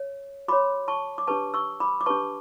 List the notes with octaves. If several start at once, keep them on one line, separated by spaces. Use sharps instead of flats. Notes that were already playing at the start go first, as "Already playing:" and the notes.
Already playing: C#5
F#4 C#5 B5 D6
A5 C#6
D6
D4 G4 B4 A5 C#6
C#6 E6
B5 D6
D6
D4 G4 B4 A5 C#6